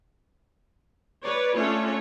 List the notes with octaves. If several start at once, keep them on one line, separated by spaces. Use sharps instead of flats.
B4 C#5 D5
A3 C#4 D4 F4 A4 C#5